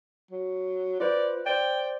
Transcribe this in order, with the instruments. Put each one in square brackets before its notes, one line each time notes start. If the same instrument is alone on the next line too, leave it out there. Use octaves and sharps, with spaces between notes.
[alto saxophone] F#3
[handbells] F4 B4 C5 [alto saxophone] D5
[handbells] C5 D5 [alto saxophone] G5